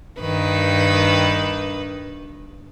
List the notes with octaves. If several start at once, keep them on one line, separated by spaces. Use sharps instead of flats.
G2 D#3 B4